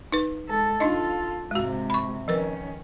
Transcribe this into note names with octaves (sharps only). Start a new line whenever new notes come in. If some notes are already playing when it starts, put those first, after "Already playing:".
D#4 B4
G#3 A4
D4 D#4 F4 A4 D#5
G#2 C3 G#3 F#4
B5 C#6
D#3 F3 C#4 A#4 B4